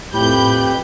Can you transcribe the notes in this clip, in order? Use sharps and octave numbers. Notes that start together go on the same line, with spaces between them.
F2 A2 G4 B4 G5 B5 G6